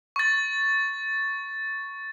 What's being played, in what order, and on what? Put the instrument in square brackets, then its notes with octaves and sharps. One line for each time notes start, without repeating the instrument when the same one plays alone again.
[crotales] C#6 A6